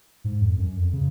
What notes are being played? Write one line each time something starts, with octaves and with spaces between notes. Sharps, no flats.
G#2
F2
F#2
F2
C#3